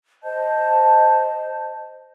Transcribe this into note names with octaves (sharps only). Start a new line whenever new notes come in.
C5 D#5 A5 G6